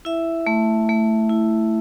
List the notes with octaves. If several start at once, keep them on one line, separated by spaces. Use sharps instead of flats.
E4 E5
A3
A3
E4